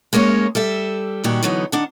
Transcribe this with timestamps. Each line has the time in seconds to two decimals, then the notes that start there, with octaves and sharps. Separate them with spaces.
0.13 G#3 A#3 C#4 E4 C#5
0.55 G3 A4 E5
1.24 A#2 D#3 G3 D4 F#4 G4
1.43 D3 E3 F#3 B3 D#4
1.72 D#3 D4 F#5